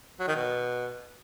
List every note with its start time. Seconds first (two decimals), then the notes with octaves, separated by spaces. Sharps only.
0.20 F#3
0.28 D#3
0.36 B2